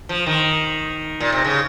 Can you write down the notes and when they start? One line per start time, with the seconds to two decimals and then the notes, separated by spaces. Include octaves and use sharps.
0.09 F3
0.26 D#3
1.20 A#2
1.32 C3
1.44 C#3